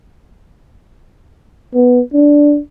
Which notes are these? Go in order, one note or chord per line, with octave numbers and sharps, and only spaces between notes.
B3
D4